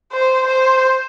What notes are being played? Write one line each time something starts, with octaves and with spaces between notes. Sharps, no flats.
C5
C5